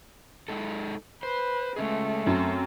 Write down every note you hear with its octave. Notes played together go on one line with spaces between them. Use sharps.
G#3 D#4 A4
B4 C5
G#3 A3 C#4 G#4
F#2 C4